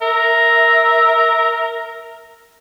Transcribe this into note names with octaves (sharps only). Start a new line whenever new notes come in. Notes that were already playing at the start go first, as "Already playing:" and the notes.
A#4 E5